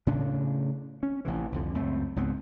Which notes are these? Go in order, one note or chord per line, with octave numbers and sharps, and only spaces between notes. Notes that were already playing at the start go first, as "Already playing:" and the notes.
A2 C#3 D4
C#4
A1 C3 E3
C2 F2 D3
C#2 F#2 A3 C4
C#2 G#2 B3 C4